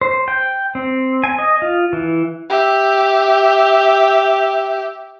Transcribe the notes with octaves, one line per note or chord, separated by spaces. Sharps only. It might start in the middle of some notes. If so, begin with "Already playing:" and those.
C5
G5
C4
G#5
D#5
F4
E3
G4 E5